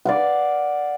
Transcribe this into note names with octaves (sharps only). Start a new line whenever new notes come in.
D5 F5 F#5